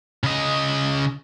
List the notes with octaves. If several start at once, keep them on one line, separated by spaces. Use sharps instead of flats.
C#3 D#5